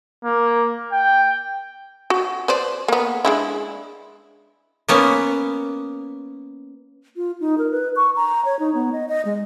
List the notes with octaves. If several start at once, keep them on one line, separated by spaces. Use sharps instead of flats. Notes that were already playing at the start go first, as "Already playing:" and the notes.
A#3
G5
F#4
B4 C5 D5
A#3 B3
G#3 D4 E4
A#3 B3 C#4
F4
D#4
A#4
B4
C#6
A#5
C#5
D#4
B3
D#5
D#5
G#3